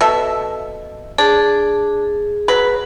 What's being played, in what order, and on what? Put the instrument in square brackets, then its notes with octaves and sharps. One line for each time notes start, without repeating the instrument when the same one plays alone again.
[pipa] B2 A4 E5
[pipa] D4 [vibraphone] G#4
[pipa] F#3 B4